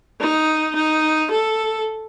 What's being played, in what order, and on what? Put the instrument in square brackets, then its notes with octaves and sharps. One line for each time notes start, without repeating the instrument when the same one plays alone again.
[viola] D#4
D#4
A4